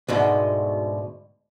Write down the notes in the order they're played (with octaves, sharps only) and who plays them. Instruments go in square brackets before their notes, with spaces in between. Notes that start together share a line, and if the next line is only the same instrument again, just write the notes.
[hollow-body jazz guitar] D2 G#2 B2